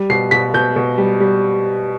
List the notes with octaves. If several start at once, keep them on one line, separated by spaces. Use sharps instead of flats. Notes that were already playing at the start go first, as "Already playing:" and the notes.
Already playing: G3
B2 C7
B2 B6
B2 G6
B2
G3
G3